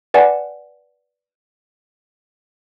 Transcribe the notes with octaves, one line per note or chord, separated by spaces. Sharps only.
B4 D5 F#5 G#5 A5